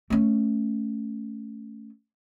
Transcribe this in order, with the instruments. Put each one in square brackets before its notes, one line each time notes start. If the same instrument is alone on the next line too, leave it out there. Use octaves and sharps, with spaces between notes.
[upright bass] A3 C#4